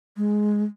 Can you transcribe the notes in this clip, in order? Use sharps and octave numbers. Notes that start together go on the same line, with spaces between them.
G#3